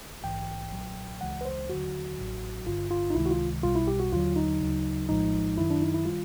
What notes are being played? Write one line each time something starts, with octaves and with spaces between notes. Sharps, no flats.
A#1 G#2 E3 G5
B1 A#2 F#3
C#2 C#3 E3 G#3 F#5
B4
C5
D#2 D3 F#3 F#4
A1 A2 F#3
G1 G2 D3 F4
F4
D#4
C#2 C3 D#3 G#3 E4
F#4
F4
B1 B2 G3 F4
E4
G4
F#4
D#2 D3 F#3 F4
D#4
D2 C#3 F#3
A#1 A2 F3 G#3 D#4
F#2 D#3 F#3 E4
D4
D#4
E4
D#3 G3 F4